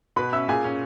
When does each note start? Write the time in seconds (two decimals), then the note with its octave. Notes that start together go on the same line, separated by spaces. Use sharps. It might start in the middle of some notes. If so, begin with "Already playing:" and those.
0.16 B2 B4 B5
0.32 C#4 E5 E6
0.48 A#2 G#4 G#5
0.64 C#4